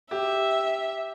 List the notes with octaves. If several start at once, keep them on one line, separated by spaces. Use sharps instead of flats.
G4 E5